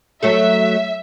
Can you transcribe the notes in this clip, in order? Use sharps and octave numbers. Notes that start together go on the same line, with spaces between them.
F#3 A3 A4 E5